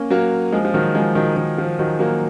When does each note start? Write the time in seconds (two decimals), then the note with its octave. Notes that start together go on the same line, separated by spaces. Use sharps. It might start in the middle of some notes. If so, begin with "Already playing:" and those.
Already playing: A#3 C#4
0.10 F#3 A#3
0.52 F3 G#3
0.65 F3
0.74 D#3 F#3
0.95 F3 G#3
1.15 D#3 F#3
1.37 D#3
1.58 F3
1.79 D#3 F#3
1.99 F#3 A#3